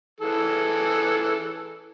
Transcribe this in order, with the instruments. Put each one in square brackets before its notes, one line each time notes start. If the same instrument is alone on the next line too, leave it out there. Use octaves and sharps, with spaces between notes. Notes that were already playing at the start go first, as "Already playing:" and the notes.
[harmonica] E3 G#4 A4